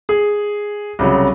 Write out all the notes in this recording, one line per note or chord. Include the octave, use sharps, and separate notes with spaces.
G#4
C2 C#3 F#3